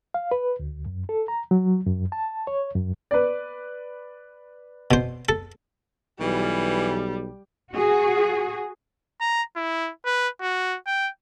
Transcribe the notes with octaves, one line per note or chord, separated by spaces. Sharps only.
F5
B4
D2
F#2
A4
A#5
F#3
F#2
A5
C#5
F#2
B4 D5
B2 C5
A4
B1 E3 G3
F#4 G#4
A#5
E4
B4
F#4
G5